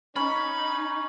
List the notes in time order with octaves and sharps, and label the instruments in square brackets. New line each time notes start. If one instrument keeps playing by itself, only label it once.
[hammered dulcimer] C#4 [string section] D#4 [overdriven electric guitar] B5